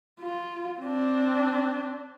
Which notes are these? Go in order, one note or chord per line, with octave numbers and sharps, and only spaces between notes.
F4
C4 D4